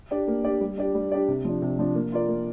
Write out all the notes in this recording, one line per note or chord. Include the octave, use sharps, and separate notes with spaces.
D4 G4 D5
A#3
D4 G4 D5
G3
D4 G4 D5
G3
D4 G4 D5
C3
F3 D4
C3
F3 D4
A#3
F4 A#4 D5
A#3